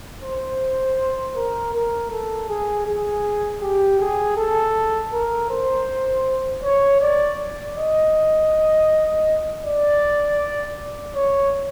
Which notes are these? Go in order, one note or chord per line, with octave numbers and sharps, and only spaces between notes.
C5
A#4
A#4
A4
G#4
G#4
G4
G#4
A4
A#4
C5
C#5
D5
D#5
D5
C#5